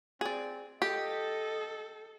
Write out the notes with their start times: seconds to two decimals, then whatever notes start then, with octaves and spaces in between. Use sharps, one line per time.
0.21 C4 G#4 D5
0.82 G4 A4 D#5